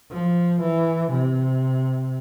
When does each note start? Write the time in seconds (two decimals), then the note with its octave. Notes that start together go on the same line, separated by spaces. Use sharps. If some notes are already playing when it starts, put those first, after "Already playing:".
0.11 F3
0.61 E3
1.12 C3